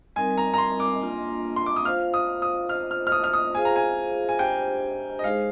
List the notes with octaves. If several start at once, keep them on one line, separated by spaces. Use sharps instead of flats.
G3 C4 D#4 A#4 D#5 G#5
A#5
A#5
C6
D6
A#3 D4 F4
C6
D6
D#6
F4 C5 F5 F6
D#6
D#6
F4 C5 D#5 F6
F6
F6
D#6
F6
D#6
F4 G#4 C5 F5 G#5
A#5
G#5
G#5
D4 G4 C5 G5
D#5
G#3 D#4 G#4 C5 F5